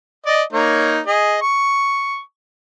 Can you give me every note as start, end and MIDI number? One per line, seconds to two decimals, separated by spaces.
0.26 0.43 74
0.26 0.43 75
0.53 1.00 58
0.53 1.00 63
0.53 1.00 73
1.07 1.37 68
1.07 1.37 75
1.42 2.19 85